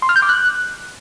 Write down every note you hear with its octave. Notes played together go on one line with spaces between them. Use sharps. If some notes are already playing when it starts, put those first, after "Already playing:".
C6
F6
G6
D6
F#6